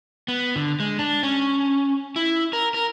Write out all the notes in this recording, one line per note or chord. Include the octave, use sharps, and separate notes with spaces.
B3
D3
G#3
D4
C#4
E4
A#4
A#4